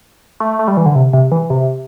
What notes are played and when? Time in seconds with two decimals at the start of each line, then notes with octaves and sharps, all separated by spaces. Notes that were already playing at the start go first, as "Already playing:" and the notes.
0.40 A3
0.59 A3
0.68 G3
0.77 E3
0.86 D3
0.95 C3
1.13 C3
1.32 E3
1.50 C3